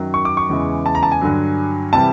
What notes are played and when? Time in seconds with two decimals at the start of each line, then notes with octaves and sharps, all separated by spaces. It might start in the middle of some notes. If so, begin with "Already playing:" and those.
Already playing: F#2 D#3 F#3
0.14 C#6
0.25 D6
0.37 C#6
0.49 E2 C#3 E3 G#3
0.86 A5
0.95 A#5
1.03 A5
1.12 G#5
1.21 G2 D3 F#3
1.93 C3 E3 G3 A5